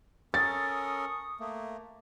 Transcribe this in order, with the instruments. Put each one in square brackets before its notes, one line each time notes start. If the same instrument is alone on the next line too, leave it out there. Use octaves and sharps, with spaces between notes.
[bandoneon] C#4 A4 A#4 [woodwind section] C#6 D#6 [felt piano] A6
[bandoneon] A3 A#3